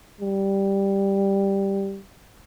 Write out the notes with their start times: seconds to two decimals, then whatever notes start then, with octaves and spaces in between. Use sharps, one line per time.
0.21 G3